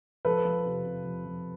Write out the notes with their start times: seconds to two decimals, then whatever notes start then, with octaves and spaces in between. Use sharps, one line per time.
0.25 F3 A4 B4
0.45 F3
0.66 C3
0.85 C3
1.05 F3
1.26 F3